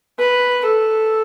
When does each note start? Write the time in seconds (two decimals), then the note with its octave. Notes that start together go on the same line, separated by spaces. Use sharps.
0.19 B4
0.65 A4